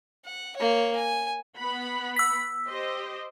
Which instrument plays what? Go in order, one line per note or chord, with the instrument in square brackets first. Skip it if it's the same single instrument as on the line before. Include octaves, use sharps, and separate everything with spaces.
[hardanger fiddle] F#5
A#3 C#5
G#5
[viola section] B3 F#5 B5
[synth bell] E6 B6
[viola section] G4 C5 D#5